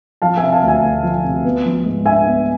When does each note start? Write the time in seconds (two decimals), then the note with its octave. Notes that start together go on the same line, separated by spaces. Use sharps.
0.22 F3 F5 A5
0.37 E5 G#5
0.43 C3
0.52 F5 A5
0.63 D2
0.68 E5 G#5
0.83 A3
1.03 F3
1.25 C3
1.45 B3
1.65 F3
1.86 G#2
2.06 D4 E5 G#5
2.27 B3